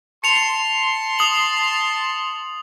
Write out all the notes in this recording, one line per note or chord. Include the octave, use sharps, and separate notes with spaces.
A5 C6 C#7 F7
D#6 F#7